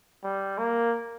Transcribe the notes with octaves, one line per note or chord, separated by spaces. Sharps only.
G3
A#3